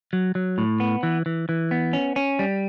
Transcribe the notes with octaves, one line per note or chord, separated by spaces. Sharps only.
F#3
F#3
A2
B3
E3
E3
E3
B3
C#4
C#4
G3